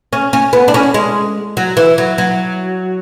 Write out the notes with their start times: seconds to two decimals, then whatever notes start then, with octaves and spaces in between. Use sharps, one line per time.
0.13 C#4
0.33 C#4
0.53 B3
0.68 D4
0.74 C#4
0.94 G#3
1.57 F#3
1.77 E3
1.98 F#3
2.18 F#3